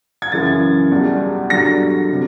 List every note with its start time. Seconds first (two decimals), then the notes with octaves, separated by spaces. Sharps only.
0.22 G#6
0.32 F#2 C#3 E3 A6
0.91 E2 B2 G3
1.50 G2 D3 F#3 A#6
2.11 C3